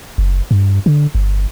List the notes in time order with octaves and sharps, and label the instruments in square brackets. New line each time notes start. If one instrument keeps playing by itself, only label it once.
[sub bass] F#1
G2
D3
G1